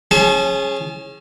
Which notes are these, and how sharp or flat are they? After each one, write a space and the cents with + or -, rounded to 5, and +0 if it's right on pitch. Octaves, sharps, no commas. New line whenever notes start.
C#4 -25 G#4 +0 A5 -35